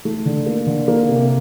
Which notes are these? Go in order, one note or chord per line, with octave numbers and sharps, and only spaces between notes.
A3
D3
A#3
D3
A#3
C3